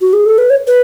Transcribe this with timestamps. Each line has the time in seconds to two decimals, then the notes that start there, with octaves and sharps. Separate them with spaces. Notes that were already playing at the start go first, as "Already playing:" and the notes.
0.01 F#4
0.13 G#4
0.26 A4
0.38 B4
0.50 C#5
0.67 B4